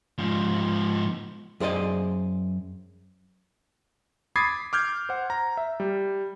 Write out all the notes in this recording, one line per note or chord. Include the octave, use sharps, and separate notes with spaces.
G#2 F3
F#2 G#4 C5 D5 D#5
B5 D6 D#6 G#6 A6 C7
D6 F6 G6 G#6
C5 F#5
A#5
E5
G3